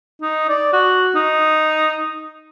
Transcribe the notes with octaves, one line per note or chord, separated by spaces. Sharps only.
D#4
D5
F#4
D#4